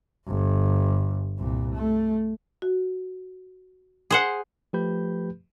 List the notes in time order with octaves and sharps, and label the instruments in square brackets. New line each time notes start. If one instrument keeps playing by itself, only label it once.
[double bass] G1
C2 A#2
A3
[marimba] F#4
[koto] G#4 C5 F#5
[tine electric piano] F3 A3 G4 B4 B5 G6